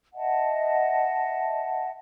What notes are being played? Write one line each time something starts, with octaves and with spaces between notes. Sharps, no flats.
D#5 E5 F#5 A5